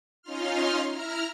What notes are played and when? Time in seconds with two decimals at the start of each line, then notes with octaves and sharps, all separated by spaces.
0.22 C#4 D#4 F4 C6 F6
0.89 E4 A#5 F6